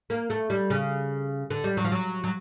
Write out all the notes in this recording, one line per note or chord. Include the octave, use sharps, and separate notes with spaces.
A#3
A3
G3
C#3
D3
G3
F#3
F3
F#3
F#3